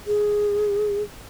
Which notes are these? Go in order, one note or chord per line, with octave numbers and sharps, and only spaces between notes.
G#4